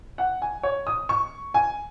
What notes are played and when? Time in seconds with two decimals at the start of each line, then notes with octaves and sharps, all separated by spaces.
0.18 F#5
0.42 G#5
0.63 C#5
0.87 D#6
1.09 C#6
1.54 G#5